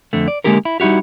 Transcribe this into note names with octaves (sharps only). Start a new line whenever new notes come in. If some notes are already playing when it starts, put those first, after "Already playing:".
F2 D3 A3
D5
D3 G#3 A#3 C#4 G4 A#4
E4
G3 D#4 E4 F#4 G4